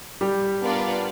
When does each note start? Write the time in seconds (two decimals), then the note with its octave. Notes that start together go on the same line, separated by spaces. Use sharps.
0.21 G3 G4
0.63 B3 D4 F4 A#4 D5